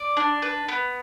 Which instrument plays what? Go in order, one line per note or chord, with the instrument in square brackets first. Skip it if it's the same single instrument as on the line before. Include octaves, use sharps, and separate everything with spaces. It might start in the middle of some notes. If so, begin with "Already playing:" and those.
Already playing: [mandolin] D5
D4
B4
B3